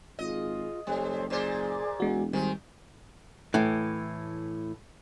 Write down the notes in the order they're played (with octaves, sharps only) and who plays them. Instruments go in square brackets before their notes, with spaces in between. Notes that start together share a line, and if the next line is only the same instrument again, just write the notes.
[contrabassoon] G#1 [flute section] F4 G#4 [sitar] D#5
[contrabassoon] F#1 [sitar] G3 [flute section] A4 C5 C#5
[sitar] A#2 C5 [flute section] G#4 D5 D6
[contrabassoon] E1 [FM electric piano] G#3 F#4
[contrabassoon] G#1 [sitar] D#3 [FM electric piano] G3 [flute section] C5 G#5
[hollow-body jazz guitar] A2 E3